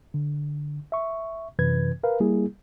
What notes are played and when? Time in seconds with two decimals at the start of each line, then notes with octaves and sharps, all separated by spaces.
0.14 D3
0.92 E5 C#6
1.59 F#2 C3 E3 B4 G#6
2.04 A#4 B4 F5
2.20 G3 A#3 E4 G#4